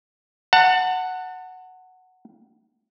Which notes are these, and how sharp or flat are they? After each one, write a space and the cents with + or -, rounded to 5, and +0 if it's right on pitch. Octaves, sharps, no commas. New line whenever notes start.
F#5 +0 A5 +35